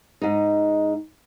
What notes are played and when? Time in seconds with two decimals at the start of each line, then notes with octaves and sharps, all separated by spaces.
0.21 G#2 D#4